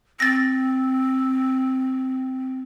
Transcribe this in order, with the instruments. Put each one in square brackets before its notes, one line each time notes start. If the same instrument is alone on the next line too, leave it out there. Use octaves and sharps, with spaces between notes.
[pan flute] C4 [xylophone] A6 A#6